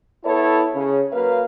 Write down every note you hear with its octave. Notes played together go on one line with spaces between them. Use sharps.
B3 E4 A4 C#5 E5 A5
C#3
F#3 A#3 B4 F5